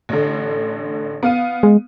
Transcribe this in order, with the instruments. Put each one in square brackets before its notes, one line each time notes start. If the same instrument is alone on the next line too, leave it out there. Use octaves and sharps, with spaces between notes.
[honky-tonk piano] A1 D3
B3 F5 D#7
[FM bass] G#3